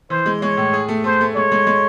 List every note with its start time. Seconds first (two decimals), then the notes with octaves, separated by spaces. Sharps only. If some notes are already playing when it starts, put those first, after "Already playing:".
0.10 E3 C5
0.26 G#3
0.42 G#3 C#5
0.57 A2
0.73 G#4
0.88 A3
1.04 A3 C5
1.21 A3
1.35 G#3 C#5
1.52 G#3
1.67 G#3